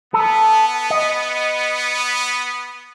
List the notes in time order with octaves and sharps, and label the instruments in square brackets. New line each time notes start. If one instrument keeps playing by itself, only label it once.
[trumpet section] B3 [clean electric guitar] A4
[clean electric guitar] D#5